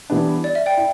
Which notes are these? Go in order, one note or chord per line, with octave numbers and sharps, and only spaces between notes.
E3 G3 B3 D4
D5
E5
D5 G5
E4